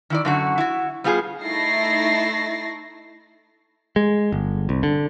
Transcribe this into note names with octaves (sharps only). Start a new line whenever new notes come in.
D#3 E4 D5
F#2 D3 F#4
E4 F#4
G3 B3 F4 G4 G#4
A3 D#4 E4 A6 A#6 C7
G#3
G1
C2
D3